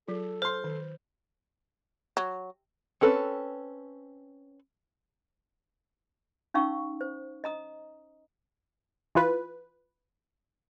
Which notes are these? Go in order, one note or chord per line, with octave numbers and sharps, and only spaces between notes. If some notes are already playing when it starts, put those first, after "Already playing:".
F#3 F4 G#4 A4
C5 C6 F6
D#3
F#3
C4 C#4 A4 B4
C#4 D#4 F5 C#6 E6
C5
D#5 A#5 D#6
E3 F4 B4